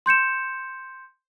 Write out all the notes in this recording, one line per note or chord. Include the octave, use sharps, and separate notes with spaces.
C6 G6 C#7 E7